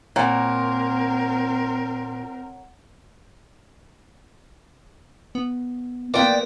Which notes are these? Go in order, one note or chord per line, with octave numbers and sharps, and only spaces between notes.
A#2 C4 A#4 C#5 F#5 A#5
B3
A#3 B3 F4 A#4 B4 D5 G5